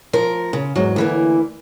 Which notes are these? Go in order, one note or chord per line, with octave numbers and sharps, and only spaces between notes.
F3 A#4
C#3
E2 G#2 F#3
D2 E3 A#3